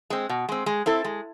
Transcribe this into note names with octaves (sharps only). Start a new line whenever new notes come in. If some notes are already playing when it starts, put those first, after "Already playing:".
G#3 C4
B2
G#3 C4
G#3
C4 E4 A4
G#3